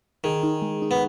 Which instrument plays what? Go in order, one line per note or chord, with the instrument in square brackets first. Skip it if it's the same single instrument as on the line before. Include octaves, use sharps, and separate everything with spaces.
[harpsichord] D#3 [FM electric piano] G#4
[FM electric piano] D#4
G#3
D#4
[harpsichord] B3